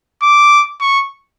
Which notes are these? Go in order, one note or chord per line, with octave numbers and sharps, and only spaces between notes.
D6
C#6